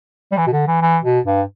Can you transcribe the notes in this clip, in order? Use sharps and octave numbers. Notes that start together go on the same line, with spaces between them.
G3
E3
B2
D3
E3
E3
B2
G2